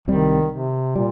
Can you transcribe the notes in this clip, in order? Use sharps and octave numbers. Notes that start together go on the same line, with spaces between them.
C2 C3 D#3 G3
C3
A#2 G3